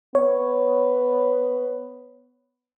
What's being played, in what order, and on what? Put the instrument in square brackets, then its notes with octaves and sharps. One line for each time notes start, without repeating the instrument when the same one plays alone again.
[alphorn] B3 [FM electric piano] C#5